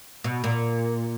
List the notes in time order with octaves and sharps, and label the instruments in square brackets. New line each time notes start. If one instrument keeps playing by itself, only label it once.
[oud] B2
A#2